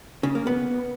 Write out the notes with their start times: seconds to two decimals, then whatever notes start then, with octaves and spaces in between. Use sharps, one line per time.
0.23 C#3
0.35 A#3
0.47 B3